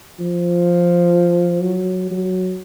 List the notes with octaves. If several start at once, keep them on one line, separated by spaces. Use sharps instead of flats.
F3
F#3
F#3